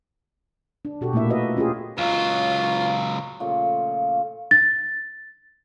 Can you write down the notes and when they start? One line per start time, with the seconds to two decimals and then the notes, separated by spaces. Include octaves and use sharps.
0.85 D4
1.01 B2 F#4 G4 A4
1.13 A#2 A3 A#3 E4 E5
1.30 F#4 B4 D#5 E5
1.56 C#4 F4 G4 G#4
1.98 C#2 F#3 F4
3.40 A#2 C#3 F3 A3
4.51 A6